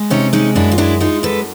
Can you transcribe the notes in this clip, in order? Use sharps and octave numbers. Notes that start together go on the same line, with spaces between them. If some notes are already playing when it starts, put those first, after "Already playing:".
Already playing: G#3
C3 C#4 D#4
G#3 C#4 D#4
F#2 D4 E4
F4
G#3 D4 E4
G#3 D#4 F4
F#2 A4 B4